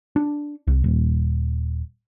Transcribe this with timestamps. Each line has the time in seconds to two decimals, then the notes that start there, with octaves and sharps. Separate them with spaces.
0.16 D4
0.67 C2
0.84 D#1